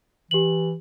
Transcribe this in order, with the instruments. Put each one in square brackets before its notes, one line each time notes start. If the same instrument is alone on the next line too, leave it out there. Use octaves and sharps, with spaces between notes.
[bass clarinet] E3 [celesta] G4 F#7